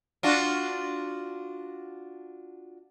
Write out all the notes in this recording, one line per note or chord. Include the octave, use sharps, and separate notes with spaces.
D4 F4 F#4